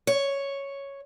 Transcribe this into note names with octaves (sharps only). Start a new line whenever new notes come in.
C#5